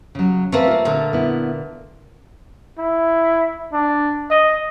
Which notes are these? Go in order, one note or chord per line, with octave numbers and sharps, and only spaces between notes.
C#3 F#3
A3 A#3 C4 B4
C4 F4
A#2 D3 A4
B3 E4
E4
D4
D#5